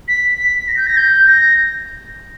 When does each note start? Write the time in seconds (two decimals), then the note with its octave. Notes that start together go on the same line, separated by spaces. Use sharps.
0.08 B6
0.38 B6
0.68 A#6
0.77 G6
0.87 A#6
0.97 G6
1.27 A#6